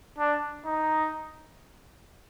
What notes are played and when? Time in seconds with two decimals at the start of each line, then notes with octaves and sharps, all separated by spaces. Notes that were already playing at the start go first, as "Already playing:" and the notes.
0.18 D4
0.66 D#4